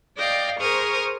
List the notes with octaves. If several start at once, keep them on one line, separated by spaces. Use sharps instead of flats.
D5 D#5 F5 G5
G#4 A#4 C5 C#6 D#6 F6